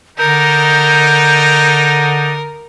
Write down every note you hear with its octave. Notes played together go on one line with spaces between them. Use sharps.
D3 D4 D#4 A#4 G6